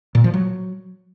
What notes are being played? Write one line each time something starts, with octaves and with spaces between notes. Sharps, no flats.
A#2
F3
F#3